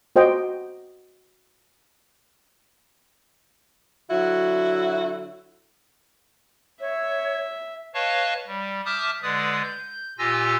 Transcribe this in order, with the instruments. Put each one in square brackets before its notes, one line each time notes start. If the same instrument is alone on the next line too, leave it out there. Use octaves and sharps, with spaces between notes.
[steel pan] F#4 C5 D#5 G5
[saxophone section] D3 F#3 E4 F#4
[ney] C#5 [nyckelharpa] E5
[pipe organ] B4 C#5 D#5 F5 A5 C#6
G3
E5 A5 D6 D#6 F6 G6
D3 G#3 B4 D5 D#6
G6
A#2 F4 G4 G#5 E6 A#6